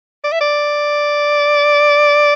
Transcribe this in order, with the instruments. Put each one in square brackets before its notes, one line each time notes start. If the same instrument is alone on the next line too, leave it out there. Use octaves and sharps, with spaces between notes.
[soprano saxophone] D5
E5
D5